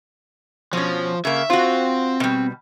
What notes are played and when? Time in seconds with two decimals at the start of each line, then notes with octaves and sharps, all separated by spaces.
0.73 B2 F3 C#4
1.25 C#3 A#3 E5
1.50 C4 F4 F#4
2.20 B2 G3